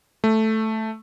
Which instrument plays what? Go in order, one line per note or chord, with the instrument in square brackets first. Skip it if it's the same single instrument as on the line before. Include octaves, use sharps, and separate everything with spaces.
[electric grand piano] A3